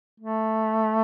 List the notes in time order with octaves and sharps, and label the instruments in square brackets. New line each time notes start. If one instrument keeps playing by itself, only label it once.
[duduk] A3